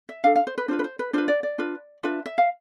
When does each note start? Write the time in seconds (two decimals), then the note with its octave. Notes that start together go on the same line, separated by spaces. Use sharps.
0.09 E5
0.24 D4 A4 F5
0.36 F5
0.47 C5
0.58 B4
0.68 D4 F4 B4 C5
0.79 B4
0.84 C5
0.99 B4
1.13 D4 F4 B4 C5
1.28 D5
1.43 D5
1.58 D4 F4 B4
2.03 D4 F4 B4 E5
2.26 E5
2.38 F5